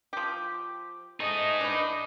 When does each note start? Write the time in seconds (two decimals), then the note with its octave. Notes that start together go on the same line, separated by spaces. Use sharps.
0.13 F3 G4
1.20 A3 D#4 G#4 D#5
1.61 E3 D4